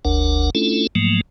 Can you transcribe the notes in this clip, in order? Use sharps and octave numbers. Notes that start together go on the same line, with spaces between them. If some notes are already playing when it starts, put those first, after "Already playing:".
F#1 D2 D4 A#4 F#5
A3 C#4 D4 E4 F4 A4
G#2 F3 F#3 A3 A#3